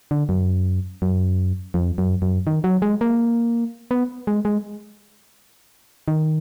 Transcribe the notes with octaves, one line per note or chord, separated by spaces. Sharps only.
D3
F#2
F#2
F2
F#2
F#2
D#3
F#3
G#3
A#3
B3
G#3
G#3
D#3